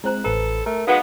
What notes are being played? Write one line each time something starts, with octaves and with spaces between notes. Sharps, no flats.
G#3 C4 E4 C5 A#5 F#6
A1 A4 B4 A#5
A3 A#4
F#3 G#3 B3 D#4 F5 F#5 D6